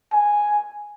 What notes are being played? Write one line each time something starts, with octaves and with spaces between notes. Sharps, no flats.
G#5